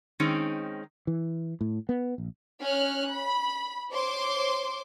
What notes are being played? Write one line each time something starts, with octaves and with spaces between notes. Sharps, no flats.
D#3 G#3 C4 C#4 D#4
E3
A2
B3
A#1
C#4 C#5 F6 F#6
B5
C5 C#5 C6 D6